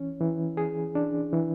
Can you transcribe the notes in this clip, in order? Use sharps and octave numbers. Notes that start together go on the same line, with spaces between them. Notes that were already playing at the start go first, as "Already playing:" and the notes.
Already playing: E3 C#4
E3
G#4
D4
E3